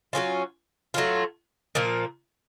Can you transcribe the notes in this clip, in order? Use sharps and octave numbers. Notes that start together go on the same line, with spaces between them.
F#3 A3 C#4 F4
F#3 A3 C#4 F4
A#2 F3 A#3